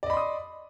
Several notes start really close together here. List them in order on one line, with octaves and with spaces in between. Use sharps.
D5 D#5 B5 C6 D#6